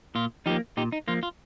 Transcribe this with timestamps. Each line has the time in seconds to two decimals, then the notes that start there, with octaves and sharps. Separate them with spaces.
0.15 A#2 F4
0.46 F3 A#3 D#4 G4
0.77 A#2 D#4 G4
0.92 D#4
1.08 F3 A#3 F4
1.23 F4